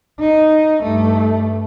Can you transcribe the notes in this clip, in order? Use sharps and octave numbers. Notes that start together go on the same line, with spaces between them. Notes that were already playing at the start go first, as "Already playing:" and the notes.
D#4
G2 A3